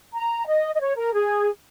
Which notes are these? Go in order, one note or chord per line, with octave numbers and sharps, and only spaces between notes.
A#5
D#5
D#5
C#5
A#4
G#4